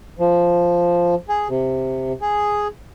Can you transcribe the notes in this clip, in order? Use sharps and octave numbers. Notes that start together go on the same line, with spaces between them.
F3
G#4
C3
G#4